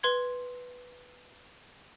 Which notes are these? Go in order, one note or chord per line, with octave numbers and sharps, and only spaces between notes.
B4 C6 G#6